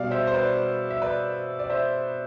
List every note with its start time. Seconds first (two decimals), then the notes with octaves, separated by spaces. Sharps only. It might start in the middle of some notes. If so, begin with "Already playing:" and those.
Already playing: B2 G3 D5 F5
0.11 C5 E5
0.27 C5
0.34 B4 D5
0.90 E5
1.02 B4 D5
1.59 D5
1.70 C5 E5